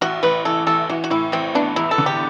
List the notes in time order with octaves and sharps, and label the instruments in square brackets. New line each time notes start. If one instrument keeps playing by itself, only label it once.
[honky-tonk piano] A1 [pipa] F#4
[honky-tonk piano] A1 [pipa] B4
[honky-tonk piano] E3 [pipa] A4
[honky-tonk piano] A1 [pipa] A4
[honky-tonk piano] E3 [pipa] F#4
[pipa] F#4
[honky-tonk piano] A2 [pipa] E4
[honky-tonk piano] A1 [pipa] C4
[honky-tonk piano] B3 [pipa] D4
[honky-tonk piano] E2 [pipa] E4
[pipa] A4
[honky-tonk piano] D3
[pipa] G4